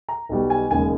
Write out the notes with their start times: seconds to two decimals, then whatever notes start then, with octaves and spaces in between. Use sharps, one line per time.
0.09 A#5
0.29 B1 B2 G3
0.50 G#5
0.71 E1 D#2 C#3 G#3 G#5